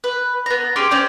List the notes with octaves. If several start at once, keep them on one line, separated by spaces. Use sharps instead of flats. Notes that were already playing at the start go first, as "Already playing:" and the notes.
B4
B3 A#5
C#4 G4 G#4 C6
C4 C#4 D5 G5